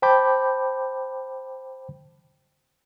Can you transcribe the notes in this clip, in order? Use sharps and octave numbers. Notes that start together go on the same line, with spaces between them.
C5 G5 A5 B5 D6 G6